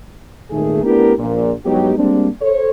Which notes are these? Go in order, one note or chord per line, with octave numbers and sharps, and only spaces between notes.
G#1 D#2 A#2 D#3 A3 G#4
A3 B3 D4 E4 G4 A#4
A#1 A#2
G2 F#3 G#3 B3 D#4 G4
G3 G#3 A#3 C4 D4
A4 C5 C#5